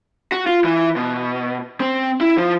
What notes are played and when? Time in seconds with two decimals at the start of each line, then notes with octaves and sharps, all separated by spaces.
0.32 F#4
0.47 F4
0.64 E3
0.96 B2
1.80 C4
2.21 E4
2.38 F3